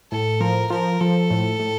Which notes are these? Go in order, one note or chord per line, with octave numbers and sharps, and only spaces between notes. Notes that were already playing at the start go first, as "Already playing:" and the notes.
A2 A4
F3 A#4
F3 A#4
F3 A4
A2
A2